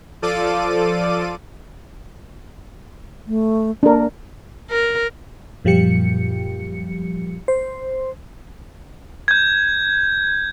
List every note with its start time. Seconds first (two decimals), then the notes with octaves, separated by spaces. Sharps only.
0.22 F3 F4 A4 D5 D6 D#7
3.27 A3
3.83 A#3 D4 A#4
4.71 A#4
5.65 F#2 A#2 F3 G3 G4 C#7
7.48 C5
9.28 G6 G#6